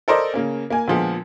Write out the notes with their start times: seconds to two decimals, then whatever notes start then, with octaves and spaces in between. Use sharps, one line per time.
0.08 A4 A#4 C5 D5 D#5
0.34 C#3 A#3 C#4
0.70 A#3 G#5
0.88 A#2 D3 F3 G#3 B3